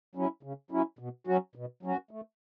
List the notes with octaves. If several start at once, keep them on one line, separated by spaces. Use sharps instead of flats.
F#3 C#4 E4
C#3
F#3 C#4 E4
B2
F#3 C#4 F#4
B2
F#3 C#4 F#4
A3